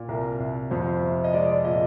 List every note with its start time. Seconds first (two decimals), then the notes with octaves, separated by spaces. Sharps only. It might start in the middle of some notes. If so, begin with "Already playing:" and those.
Already playing: A#2
0.08 C2 A#4
0.40 C2
0.70 F2 C5
1.02 C3
1.24 D#5
1.33 G#3 D5
1.49 D5
1.64 A#2 D#5